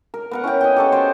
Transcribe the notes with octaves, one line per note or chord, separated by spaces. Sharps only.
A#4
B3 A#4 F#5
C#4 E4 B4 G5
D#5 F#5 G5
G4 A4 C#5
F#4 C5 G5